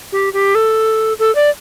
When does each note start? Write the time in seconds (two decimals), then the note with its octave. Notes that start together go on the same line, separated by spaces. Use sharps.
0.12 G4
0.33 G4
0.55 A4
1.19 A4
1.35 D5